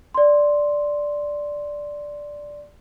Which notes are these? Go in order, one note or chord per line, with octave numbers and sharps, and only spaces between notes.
D5 C6